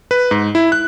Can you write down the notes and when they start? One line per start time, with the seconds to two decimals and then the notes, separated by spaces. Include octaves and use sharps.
0.11 B4
0.31 G#2
0.55 E4
0.72 F#6